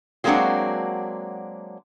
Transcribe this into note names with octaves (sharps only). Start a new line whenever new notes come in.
F#3 G#3 A#3 C4 D4 F#4